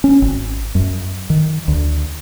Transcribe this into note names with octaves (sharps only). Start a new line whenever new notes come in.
C#4
G#1
F#2
D#3
D2